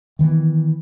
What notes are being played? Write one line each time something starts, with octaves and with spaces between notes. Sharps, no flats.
D#3 E3 B3